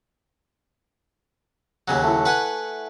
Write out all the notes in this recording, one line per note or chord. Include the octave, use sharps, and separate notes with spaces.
D#2 C#3 F#3
A3 E4
B4 F#5 G#5